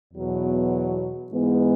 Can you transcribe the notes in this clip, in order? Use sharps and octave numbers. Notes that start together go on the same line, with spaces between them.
E2 B2 F#3 B3
G#2 E3 G#3 B3